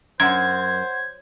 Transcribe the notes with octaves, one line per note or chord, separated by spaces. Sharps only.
F#2 C5 F#5 C6 G#6